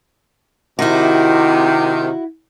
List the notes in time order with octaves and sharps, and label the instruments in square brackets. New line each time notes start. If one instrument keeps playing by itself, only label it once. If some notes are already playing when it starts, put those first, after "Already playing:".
[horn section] C3 D#3 [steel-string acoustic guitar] E4 F#4